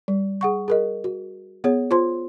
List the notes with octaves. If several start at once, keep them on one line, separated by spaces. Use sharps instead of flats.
G3
G#4 F#5 C#6
G#4 A#4 D#5
F#4
B3 G#4 C#5
F4 C5 C6